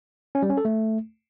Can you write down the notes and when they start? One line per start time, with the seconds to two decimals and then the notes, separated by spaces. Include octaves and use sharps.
0.35 C#4
0.42 G3
0.50 C#4
0.57 A4
0.65 A3